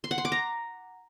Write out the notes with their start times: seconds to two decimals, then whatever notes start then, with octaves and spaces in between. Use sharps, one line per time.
0.04 C6
0.11 F#5
0.18 C6
0.25 D6
0.32 A#5